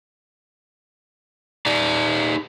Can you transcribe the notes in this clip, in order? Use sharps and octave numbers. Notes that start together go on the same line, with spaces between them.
D#4 G4 D5